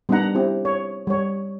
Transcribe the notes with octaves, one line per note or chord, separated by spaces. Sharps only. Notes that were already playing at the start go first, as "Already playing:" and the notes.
G3 B3 D4 D#4 F#5 A#5
C4 E4 G4
C#5
G3 C#5